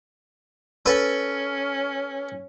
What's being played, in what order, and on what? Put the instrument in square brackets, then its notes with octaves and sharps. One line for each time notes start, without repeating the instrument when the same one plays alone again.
[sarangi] C#4 [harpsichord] A4 B4